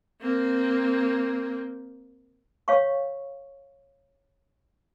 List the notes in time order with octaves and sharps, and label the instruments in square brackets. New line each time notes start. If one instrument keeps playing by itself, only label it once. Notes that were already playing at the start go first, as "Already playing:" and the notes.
[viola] A#3 C4
[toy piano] C#5 F5 C#6